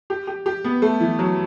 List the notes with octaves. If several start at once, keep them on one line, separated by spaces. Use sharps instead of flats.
G4
G4
G4
B3
A3
E3
F#3